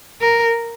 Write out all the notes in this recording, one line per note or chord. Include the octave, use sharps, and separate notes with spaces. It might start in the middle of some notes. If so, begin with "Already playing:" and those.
A#4